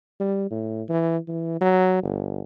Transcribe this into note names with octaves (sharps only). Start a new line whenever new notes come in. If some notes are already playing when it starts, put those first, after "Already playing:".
G3
A2
E3
E3
F#3
G1